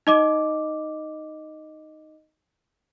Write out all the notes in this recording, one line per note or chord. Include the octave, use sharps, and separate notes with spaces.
D#4 D#5 D6